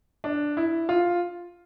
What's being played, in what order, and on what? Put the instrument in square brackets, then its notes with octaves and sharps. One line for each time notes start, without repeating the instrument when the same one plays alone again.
[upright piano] D4
E4
F4